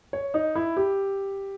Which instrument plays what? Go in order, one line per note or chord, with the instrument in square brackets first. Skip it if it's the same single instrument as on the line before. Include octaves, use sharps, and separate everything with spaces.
[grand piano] C#5
D#4
E4
G4